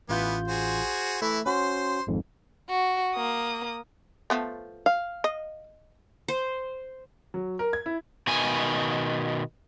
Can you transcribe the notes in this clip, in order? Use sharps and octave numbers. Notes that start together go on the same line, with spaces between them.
A1 E3 B3 F4 G6
F#4 G#4 C5
E3 A3 E4
C#4 F#4 C5 C6
G#1 F2 G#2
F#4
A#3 D#6
F3 A3 B3
F5
D#5
C5
F#3
A#4
G#6
E4
B2 D#3 G#5